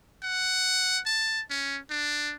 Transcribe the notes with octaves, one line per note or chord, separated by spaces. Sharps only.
F#5
A5
C#4
D4